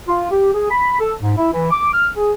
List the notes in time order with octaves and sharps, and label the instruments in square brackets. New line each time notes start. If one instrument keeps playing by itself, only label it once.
[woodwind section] F4
G4
G#4
B5
A4
G#2
E4
E3
D6
F6
G#4